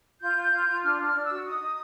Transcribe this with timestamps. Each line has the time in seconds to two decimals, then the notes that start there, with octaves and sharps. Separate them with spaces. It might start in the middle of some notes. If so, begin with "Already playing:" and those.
0.20 F4 G6
0.36 F4
0.51 F4
0.68 F4
0.83 D4 F6
0.99 D4 F6
1.14 D4
1.24 E6
1.30 F#4
1.45 D#4 D#6
1.61 D#4